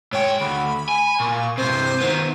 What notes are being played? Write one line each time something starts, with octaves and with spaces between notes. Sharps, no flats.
G#2 C#5 G5
D2 B5
G#5
A#2 C#6
G2 C3 C5
D#3 B3